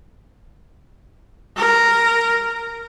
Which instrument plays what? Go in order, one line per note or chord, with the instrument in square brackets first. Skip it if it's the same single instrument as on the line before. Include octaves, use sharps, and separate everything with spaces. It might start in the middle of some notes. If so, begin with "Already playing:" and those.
[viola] A#4